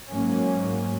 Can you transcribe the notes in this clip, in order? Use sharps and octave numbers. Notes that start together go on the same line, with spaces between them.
G#2 F#3 A#3 C#4